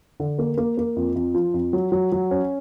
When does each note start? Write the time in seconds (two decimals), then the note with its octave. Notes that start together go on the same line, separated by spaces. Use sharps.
0.20 D3
0.39 A#3
0.58 A#3
0.77 A#3
0.96 F2
1.15 F2
1.34 F3
1.54 F2
1.73 F#3
1.92 F#3
2.12 F#3
2.31 C#4